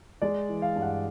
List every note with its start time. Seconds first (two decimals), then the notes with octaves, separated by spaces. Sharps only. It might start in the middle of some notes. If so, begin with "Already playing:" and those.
0.22 G#3 D5
0.49 E3
0.62 F5
0.76 G2
0.82 F#5